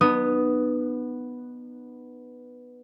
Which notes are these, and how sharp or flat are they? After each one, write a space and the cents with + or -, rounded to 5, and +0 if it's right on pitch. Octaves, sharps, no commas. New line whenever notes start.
B3 +0 D#4 -40 D#6 +0